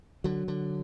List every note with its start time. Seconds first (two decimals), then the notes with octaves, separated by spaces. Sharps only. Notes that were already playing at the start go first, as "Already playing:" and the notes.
0.24 D3 F#3
0.48 D3